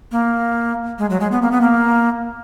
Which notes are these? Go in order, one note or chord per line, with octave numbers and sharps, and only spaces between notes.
A#3
G#3
F#3
G#3
B3
A#3
B3
A#3